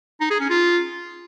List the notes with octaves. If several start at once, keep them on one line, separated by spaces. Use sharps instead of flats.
D#4
G#4
C#4
F4